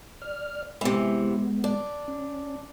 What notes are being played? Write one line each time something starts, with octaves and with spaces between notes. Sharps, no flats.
D5 F6
C3 E3 G#3 B3
D4
C#4